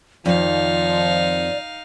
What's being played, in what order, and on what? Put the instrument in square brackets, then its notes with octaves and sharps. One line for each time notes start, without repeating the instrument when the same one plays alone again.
[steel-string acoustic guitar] F2 [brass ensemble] D#3 F3 [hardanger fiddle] D#4 F5 [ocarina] D5